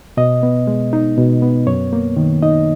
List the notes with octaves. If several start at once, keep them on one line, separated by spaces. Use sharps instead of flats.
B2 D#5
B3
G#3
D#4
B2
B3
F#2 C#5
A#3
D#3
D#4 D#5